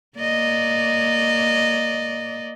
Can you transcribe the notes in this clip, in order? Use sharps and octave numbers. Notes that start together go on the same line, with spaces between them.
A#3 D5 D#5